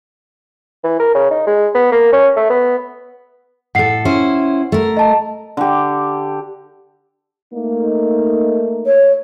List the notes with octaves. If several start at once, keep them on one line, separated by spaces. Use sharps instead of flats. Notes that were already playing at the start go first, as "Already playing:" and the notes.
E3
A#4
C#3
D#4
G#3
B3
A#3
C#4
A3
B3
A2 A4 F#5 C7
C#4 E4 C5
A3 A#4
D#5 A5
D3 G4
A3 A#3 D#4
C#5